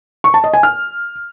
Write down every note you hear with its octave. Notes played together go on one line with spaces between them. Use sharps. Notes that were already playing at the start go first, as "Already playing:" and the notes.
C#6
A5
D#5
G#5
F6